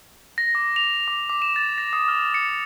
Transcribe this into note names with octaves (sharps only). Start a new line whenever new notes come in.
A#6
D6
F7
D6
D6
E7
A6
A#6
D#6
F6
C#7